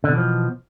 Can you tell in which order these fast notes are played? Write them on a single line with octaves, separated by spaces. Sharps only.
D3 B2 E3 F3